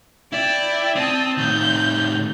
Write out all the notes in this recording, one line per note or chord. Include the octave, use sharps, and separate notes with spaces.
E4 D5 G5
C4 A5 D#6
A2 D#3 G6